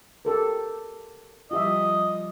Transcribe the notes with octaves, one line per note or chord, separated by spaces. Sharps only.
G4 A4 A#4
F3 G3 F4 G4 D#5 E5